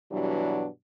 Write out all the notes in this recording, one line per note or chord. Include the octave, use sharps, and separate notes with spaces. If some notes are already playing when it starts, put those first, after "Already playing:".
G2 B2 E3 F#3 G3 D4